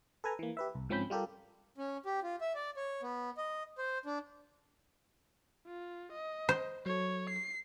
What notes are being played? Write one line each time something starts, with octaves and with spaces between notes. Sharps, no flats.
A4 B4 G#5 A#5
E3 A#3
G4 B4 E5
C2
G#2 F3 C4 C#4 B5 G6
G3 F4 G4 A4 A#4
C#4
G4
F4
E5
D5
C#5
B3
D#5
C5
D4
F4
D#5
C5
F#3 A4 C#5
C7